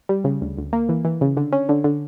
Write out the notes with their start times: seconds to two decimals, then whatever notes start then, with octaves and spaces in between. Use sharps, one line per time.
0.09 G3
0.24 C#3
0.41 D2
0.58 D2
0.73 A#3
0.89 E3
1.05 E3
1.21 C#3
1.37 D3
1.52 C#4
1.69 D3
1.84 D3